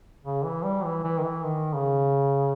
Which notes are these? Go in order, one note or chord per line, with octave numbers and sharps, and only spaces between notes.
C#3
E3
G3
E3
E3
D#3
E3
D#3
C#3